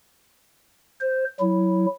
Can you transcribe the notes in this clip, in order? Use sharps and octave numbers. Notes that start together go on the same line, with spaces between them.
C5
F#3 E4